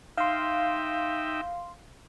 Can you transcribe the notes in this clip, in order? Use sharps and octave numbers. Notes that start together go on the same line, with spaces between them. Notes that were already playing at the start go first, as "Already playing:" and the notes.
D#4 E5 F5 G5 C6